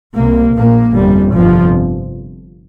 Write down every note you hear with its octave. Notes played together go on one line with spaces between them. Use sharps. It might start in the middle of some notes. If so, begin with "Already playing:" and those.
C2 C3 A#3
A#1 A#2 A#3
G1 F2 C3 G3
G1 F2 C3 F3